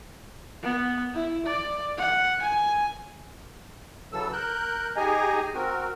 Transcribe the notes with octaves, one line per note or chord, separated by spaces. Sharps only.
B3
E4
D5
F#5
G#5
C#3 E3 F#3 A4 E6
A#4 F#6 G6
D#4 G4 G#4 D#5 G#5 A#5
C4 F#4 A#4